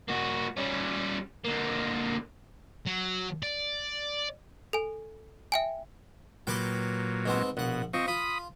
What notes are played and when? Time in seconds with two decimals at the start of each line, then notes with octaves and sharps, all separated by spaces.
0.08 A#3 F#4
0.57 G3 C#4
1.45 D3 A#3
2.86 F#3
3.43 D5
4.73 A4 G#5
5.52 E5 G5 G#5
6.47 A#2 F#3 G4 B4 G5
7.26 G#2 B3 C4
7.57 A#1 B2 F#5
7.94 F3 C4 D#5 C#6
8.08 F4 B5 D#6